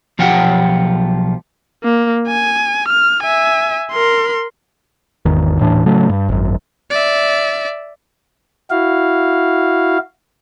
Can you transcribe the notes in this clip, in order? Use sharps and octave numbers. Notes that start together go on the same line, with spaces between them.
B1 F3 F4 G4 F#5
A#3
G#5
F6
E5 G#5
A#4 C6
G#1 E2 D#3
D#1 A2 E3 D4
A2 C#3 F#3 A3
G2
G#1 F#2
D5 E5
E4 F#4 F5